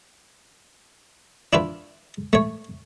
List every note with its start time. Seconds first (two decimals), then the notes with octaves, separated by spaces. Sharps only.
1.53 D4 E4 F4 B4
2.33 A3 C#5